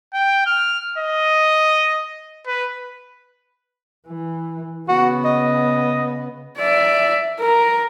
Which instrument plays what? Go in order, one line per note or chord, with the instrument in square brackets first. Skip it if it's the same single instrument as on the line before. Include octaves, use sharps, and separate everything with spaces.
[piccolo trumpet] G5
F6
D#5
B4
[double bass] E3
[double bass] C#3 B3 [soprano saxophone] F#4
[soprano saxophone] D#5
[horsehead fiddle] D5 E5
A#4